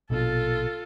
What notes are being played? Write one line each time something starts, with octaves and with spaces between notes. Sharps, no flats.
A#1 B2 F4 A4